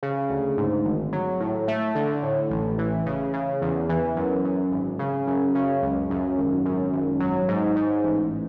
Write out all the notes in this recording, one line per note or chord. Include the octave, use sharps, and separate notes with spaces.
C#3
D2
G#2
G#1
F#3
A2
A3
D3
A2
A1
E3
C#3
C#3
E2
E3
F#2
F#2
G#1
C#3
F#2
C#3
C#2
F#2
G#1
F#2
G#1
F#3
G#2
G#2
A1